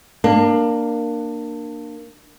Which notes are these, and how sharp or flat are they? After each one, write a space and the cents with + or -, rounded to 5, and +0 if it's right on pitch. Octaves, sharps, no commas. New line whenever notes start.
A#3 +0 D4 +20